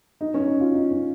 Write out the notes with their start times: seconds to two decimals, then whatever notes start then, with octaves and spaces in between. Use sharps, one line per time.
0.21 D#4
0.34 C#4
0.46 D#4
0.61 F4
0.74 D#4
0.91 C#4